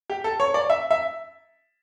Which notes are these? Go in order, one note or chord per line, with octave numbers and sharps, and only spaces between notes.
G4
A4
C#5
D5
E5
E5